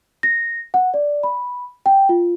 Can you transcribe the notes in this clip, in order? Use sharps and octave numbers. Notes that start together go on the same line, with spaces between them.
A#6
F#5
D5
B5
G5
F4